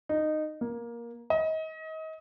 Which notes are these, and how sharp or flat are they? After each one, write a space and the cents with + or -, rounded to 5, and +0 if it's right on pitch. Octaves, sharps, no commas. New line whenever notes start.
D#4 -15
A#3 +15
D#5 +30